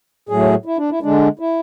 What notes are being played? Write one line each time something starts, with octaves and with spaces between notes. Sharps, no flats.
A2 F#3 A3 G#4
E4
D4
E4
D3 G#3 D4
E4